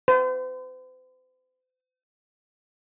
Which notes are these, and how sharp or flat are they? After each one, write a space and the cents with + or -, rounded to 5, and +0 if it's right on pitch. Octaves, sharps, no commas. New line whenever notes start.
C5 -40